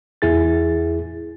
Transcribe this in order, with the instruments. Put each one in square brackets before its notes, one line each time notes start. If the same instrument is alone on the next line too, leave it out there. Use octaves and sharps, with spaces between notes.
[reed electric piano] E2 E4 G#4 A6